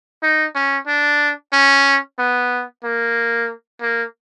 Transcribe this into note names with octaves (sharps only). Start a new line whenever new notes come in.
D#4
C#4
D4
C#4
B3
A#3
A#3